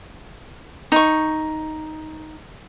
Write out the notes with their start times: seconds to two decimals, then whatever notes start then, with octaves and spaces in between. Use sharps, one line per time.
0.92 D#4 C#6